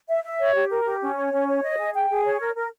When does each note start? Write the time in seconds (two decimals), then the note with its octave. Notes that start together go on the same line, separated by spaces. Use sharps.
0.08 E5
0.24 E5
0.40 C#5
0.55 G4
0.70 A#4
0.86 G4
1.01 C#4
1.17 C#5
1.33 C#4
1.48 C#5
1.63 D#5
1.79 G#4
1.94 G5
2.10 G#4
2.25 C#5
2.40 A#4
2.56 A#4